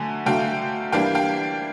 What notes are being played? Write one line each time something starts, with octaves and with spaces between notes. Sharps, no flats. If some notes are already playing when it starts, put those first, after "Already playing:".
Already playing: D3 F#3 A3 G#5
D3 F#3 A3 F5 G5
E3 G3 A#3 D4 F5 G5
F5 G5